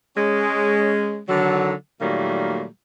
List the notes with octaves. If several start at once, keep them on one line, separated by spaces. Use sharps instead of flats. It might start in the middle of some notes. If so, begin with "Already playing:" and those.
G#3 C#4
D3 D#3 F#3
A#2 D#3 F#3 G3 A3 A#3